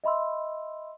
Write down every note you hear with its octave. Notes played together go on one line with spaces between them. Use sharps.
D#5 E5 B5 C6 E6